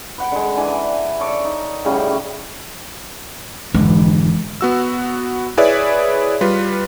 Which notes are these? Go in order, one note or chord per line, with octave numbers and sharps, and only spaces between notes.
B4 F#5 G5
D3 G#3
E3 D4 G#5
A4 C#5 D5
D#4
A2 C#3 G3 F#4
F1 G#2 D3 E3 G#3
B3 F#4 E6
E4 G#4 B4 C#5 D5 E5
G3 F4 B4